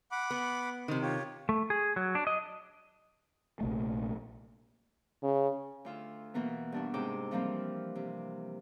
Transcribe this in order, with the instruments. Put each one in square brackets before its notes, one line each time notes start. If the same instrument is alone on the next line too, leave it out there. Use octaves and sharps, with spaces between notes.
[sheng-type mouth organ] F#5 B5 D6
[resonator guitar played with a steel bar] B3
[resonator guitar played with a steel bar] C3 D#3 [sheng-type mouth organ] C5
[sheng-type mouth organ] F4 G4 C#5
[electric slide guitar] A3
G#4
F#3
D4
D#5
[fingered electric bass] A#1 C3 A3
[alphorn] C#3
[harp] D2 F4 E6
B2 E3 A#3 B3
G2 D4 F#4
G#2 C3 G5 D6 E6
E3 F3 G3 A#3 C4
C3